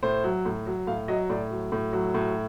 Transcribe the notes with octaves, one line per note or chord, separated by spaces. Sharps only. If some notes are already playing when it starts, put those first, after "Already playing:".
A2 C5
F#3
A2
F#3
A2 F5
F#3 D#5
A2 D5
F#3
A2
F#3
A2